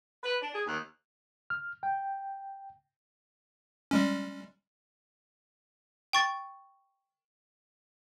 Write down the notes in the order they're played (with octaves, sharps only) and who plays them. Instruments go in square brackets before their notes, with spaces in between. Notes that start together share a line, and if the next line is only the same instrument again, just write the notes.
[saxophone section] B4
D4
G#4
D#2
[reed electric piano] F6
G5
[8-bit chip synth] G3 G#3 C#4
[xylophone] G5 C#6 A6